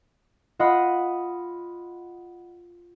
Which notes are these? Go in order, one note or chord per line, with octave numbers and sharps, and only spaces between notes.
F4 D#5 F#5 B5 D#6